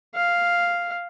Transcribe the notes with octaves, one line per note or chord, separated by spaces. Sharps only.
F5